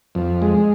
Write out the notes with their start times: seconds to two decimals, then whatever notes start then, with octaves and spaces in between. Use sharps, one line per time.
0.15 F2
0.42 G#3